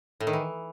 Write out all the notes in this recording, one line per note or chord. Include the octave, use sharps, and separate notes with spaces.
A2
D#3
E3